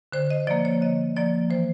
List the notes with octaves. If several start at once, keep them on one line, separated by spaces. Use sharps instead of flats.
D3 C5
D#5
F3 A#3 D5
C#5
D3 D#5
F3 A#3 D5
E3 C5